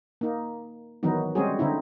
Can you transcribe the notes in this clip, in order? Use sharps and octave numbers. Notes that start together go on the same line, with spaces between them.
A#3 D#4
D#3 E3 F#3 B3 D#4
G3 G#3 C4 C#4 F#4 G#4
D3 C4 D#4 E4